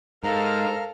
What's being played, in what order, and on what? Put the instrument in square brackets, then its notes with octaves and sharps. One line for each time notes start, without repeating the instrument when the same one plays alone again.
[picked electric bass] G#2 [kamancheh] A4 F5 [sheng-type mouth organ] A#4 F6 [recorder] A#5